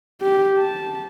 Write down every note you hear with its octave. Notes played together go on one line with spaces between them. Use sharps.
G4
A5